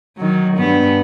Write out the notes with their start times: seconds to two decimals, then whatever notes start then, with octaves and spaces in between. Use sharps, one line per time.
0.17 D#3 F#3
0.57 G2 B3